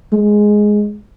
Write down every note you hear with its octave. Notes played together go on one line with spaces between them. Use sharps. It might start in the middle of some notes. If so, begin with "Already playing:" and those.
G#3